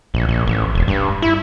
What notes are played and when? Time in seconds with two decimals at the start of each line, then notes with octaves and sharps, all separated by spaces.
0.14 A#1
0.29 A#1
0.48 A1
0.75 E1
0.88 G2
1.22 E4